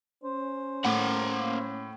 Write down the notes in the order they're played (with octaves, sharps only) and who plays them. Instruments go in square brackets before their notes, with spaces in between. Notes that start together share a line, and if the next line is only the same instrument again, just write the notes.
[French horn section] C#4 [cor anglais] C5
[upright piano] A2 [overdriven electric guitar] A#3 F#5